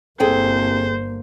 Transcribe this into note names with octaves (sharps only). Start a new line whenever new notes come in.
G1 C2 A#3 G#4 A4 C5 G5